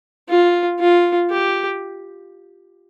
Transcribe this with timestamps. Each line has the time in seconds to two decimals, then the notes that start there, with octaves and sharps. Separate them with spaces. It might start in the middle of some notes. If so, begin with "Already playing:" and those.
0.29 F4
0.79 F4
1.30 G4